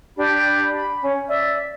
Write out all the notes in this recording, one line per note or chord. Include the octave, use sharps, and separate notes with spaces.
D4 G4 B5
B5
C#4
D5 E5